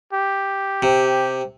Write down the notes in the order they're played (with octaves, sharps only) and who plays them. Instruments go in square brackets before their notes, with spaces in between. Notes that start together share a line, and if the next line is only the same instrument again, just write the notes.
[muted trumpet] G4
[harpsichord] C3